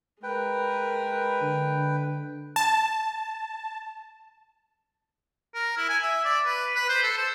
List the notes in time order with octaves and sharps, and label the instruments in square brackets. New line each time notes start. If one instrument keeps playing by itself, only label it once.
[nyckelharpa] G#3 A#4 [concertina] B4 G5
[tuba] D3
[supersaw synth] A5
[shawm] A#4
E4
G#5
E5
D5
B4
B4
C5
A4
C5